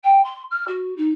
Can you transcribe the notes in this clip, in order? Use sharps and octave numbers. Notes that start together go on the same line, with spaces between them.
G5
C6
F6
F#4
D#4